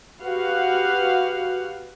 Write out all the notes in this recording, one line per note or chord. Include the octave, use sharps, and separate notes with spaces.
F#4 G4 B4 F5 F#5